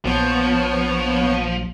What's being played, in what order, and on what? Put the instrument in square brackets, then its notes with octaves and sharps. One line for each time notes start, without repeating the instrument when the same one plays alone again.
[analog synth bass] A#1 [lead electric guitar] F3 [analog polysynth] B3 C#5